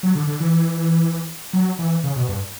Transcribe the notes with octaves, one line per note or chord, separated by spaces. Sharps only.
F#3
D3
D3
E3
F#3
E3
C#3
B2
G2